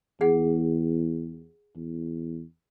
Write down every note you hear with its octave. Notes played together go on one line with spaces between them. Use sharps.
E2 G#4 F#5
E2